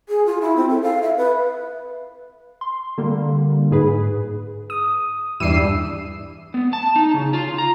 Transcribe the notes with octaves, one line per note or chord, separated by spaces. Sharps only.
G#4
F4
E4
C4
A4
F5
E5
B4
C6
D3 G3 A#3
G#2 G#4 B4
D#6
E2 G2 D4 E6 C7 D#7
B3
A5
D#4
C#3
F4
A#5